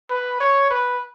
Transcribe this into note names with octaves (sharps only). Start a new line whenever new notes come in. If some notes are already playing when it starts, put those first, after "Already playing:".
B4
C#5
B4